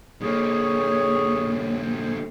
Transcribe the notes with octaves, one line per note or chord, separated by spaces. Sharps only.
D3 A#3 G#4 C#5